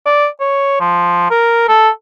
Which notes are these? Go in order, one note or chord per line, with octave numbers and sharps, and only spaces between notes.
D5
C#5
F3
A#4
A4